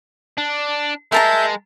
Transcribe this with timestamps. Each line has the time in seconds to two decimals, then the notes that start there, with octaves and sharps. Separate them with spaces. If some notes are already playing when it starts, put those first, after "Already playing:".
0.38 D4
1.12 G#3 A#4 E5 A5 A#5 G6